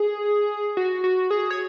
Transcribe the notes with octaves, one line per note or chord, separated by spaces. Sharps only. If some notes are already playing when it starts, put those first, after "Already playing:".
Already playing: G#4
F#4
F#4
G#4
C#5